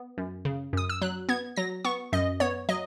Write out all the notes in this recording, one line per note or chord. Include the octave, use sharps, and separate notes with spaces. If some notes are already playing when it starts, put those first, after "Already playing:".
Already playing: B3
F#2
C#3
F#2 D#6
E6
F#3 F#6
B3 G#6
F#3 A#6
B3 C#6
F#2 D#5
B3 C#5
F#3 D#5